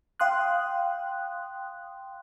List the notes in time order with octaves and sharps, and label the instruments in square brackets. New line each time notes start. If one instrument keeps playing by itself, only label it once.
[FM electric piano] F5 G5 C6 D#6 F#6